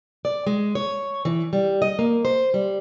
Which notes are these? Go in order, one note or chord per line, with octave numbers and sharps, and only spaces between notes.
D5
G#3
C#5
E3
G3
D#5
A#3
C5
G3